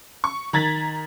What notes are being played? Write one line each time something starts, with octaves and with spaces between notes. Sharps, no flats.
C#6
D#3 A#5 G#6 A6 B6 F#7